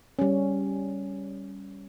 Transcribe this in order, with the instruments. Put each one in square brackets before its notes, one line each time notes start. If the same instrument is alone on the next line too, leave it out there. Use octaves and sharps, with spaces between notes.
[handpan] G3 C#4